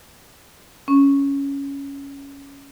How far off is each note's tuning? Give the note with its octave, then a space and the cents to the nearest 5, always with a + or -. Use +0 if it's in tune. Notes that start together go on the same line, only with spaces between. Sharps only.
C#4 +5